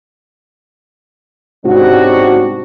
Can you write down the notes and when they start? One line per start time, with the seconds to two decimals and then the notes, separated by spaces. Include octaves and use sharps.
1.65 G#2 C3 G3 C#4 D4 F#4